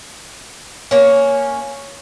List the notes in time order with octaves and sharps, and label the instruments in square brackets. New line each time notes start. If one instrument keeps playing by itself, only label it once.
[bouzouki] A#3 C#4